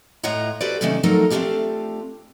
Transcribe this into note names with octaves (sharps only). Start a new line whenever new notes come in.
A2 F4 C#5 D#5 F#5 A#5
F#4 G4 A4 B4 C5 D5
C3 D#3 F#3 A3 C#4 D4
F3 F#3 A3 D#4 A4 A#4
A3 C4 D4 F4 G4 A4